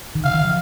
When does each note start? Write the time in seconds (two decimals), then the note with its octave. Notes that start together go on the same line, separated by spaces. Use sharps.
0.15 D#3
0.24 C#3 F5
0.34 D#3
0.45 F3